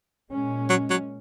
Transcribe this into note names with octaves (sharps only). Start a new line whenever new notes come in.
A#2 G#3 C#4
F#3
F#3